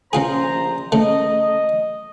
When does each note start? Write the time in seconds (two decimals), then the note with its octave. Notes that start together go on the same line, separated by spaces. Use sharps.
0.13 A#1 C#3 F4 G#4 C5 A#5
0.92 C#3 A3 D#5